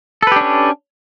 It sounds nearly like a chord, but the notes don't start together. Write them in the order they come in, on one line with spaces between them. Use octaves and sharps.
A4 B4 G4 D4 C#4